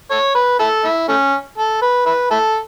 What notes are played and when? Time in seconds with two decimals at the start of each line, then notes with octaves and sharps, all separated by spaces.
0.11 A4 C#5
0.35 B4
0.59 E4 A4
0.84 E4
1.08 A3 C#4
1.58 A4
1.82 B4
2.06 E4 B4
2.31 E4 A4